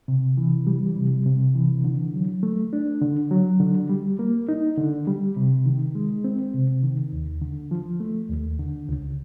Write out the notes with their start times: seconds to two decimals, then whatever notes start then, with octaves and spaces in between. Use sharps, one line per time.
0.08 C3
0.37 E3
0.67 G3
0.96 C3
1.26 C3
1.55 E3
1.84 D3
2.14 F#3
2.43 A3
2.73 D4
3.01 D3
3.31 F#3
3.60 D3
3.89 G3
4.19 A#3
4.49 D#4
4.78 D3
5.07 G3
5.36 C3
5.66 D#3
5.95 G#3
6.24 C4
6.54 C3
6.83 D#3
7.12 D#2
7.42 D3
7.71 F3
8.00 A3
8.30 D#2
8.59 D3
8.89 C#2